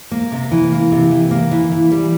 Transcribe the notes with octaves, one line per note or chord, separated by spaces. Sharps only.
A#3
C3
E3
A#3
C3
E3
A#3
E3
E3
G3